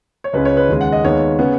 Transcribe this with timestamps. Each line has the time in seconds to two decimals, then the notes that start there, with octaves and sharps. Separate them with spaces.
0.24 C#5
0.33 C#2 C#3 G#3 C#4 B4
0.45 C#5
0.57 B4
0.69 D#2 C#3 G#3
0.81 F#5
0.92 D#5
1.04 D#2 D#3 G#3 B3 C#5
1.39 C#3 B3